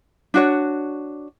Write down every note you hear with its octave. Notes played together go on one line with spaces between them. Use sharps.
D4 F#4 C#5